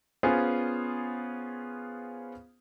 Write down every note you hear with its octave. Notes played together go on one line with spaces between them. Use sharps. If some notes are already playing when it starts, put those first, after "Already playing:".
B3 C#4 F4 G#4 C5